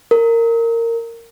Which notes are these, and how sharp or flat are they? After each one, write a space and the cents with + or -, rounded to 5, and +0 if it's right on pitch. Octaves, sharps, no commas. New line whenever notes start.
A#4 -20